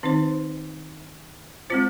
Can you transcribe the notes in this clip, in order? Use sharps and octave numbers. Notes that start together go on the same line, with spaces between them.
D#3 C4 D#4 C5
G#3 C4 F4 C5